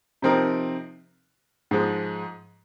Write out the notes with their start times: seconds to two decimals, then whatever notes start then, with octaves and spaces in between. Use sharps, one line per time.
0.22 C3 F3 C4 D#4 A#4
1.71 G#2 F3 G#3